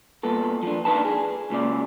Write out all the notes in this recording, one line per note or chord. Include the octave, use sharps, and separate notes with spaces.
G2 A#2 B3 A4
F3 D4
A#2 D4 D#4 B4 A5
G#4
C#2 A#2 C#3 D5